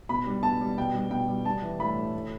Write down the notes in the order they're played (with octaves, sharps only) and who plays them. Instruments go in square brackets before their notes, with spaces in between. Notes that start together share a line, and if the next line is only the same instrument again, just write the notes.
[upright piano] B2 B5
G3
B2 A5
G3
B2 G5
G3
B2 G5
G3
G3 A5
E3
A2 B5
A2
A2